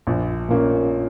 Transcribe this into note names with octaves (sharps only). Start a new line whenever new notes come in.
A#1
A#2 A#3 C#4